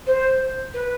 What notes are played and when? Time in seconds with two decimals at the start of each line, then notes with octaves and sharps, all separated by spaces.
0.07 C5
0.74 B4